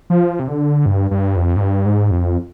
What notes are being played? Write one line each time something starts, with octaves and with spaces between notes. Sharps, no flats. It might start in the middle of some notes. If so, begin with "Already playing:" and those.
F3
C3
D3
G2
G2
F2
G#2
G2
G#2
F2